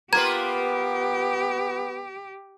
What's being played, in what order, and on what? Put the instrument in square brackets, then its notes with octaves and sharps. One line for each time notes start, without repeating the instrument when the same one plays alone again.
[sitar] A#3 F4 B4 [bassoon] B3 [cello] G4 [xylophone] A#5 G#6